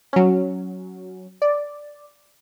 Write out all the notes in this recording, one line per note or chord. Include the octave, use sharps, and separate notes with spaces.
F#3 C#4
D5